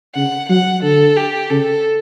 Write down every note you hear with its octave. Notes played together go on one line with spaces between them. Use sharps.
C#3 F#5
F#3 F#5
D3 A4
G4
C#3 A4